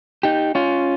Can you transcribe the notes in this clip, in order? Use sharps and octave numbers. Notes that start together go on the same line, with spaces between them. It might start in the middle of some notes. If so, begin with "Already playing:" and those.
D#4 G4
C#4 F4